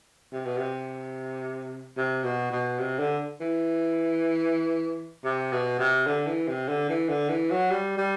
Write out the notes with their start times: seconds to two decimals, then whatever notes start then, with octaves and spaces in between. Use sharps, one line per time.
0.33 C3
0.45 B2
0.57 C3
1.97 C3
2.24 B2
2.51 B2
2.79 C3
2.99 D3
3.40 E3
5.24 C3
5.52 B2
5.79 C3
6.07 D3
6.27 E3
6.48 C3
6.69 D3
6.89 E3
7.09 D3
7.30 E3
7.50 F#3
7.71 G3
7.98 G3